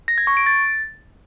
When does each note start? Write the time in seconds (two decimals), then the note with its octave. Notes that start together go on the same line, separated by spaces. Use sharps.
0.08 A#6
0.18 G#6
0.27 C#6
0.37 D7
0.46 A6